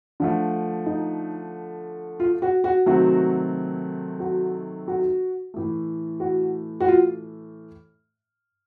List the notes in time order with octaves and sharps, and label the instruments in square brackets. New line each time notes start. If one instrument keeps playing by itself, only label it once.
[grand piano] D3 F3 A3 [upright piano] D4
[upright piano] D#4
F4
F#4
F#4
[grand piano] C3 D#3 F#3 A3 C4 [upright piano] F#4
[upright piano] F#4
F#4
[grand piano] A2 E3 A3
[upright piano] F#4
F#4
F4